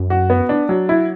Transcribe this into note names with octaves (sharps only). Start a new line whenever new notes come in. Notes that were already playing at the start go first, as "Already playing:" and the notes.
Already playing: F#2
F#4
B3
D4
F#3
E4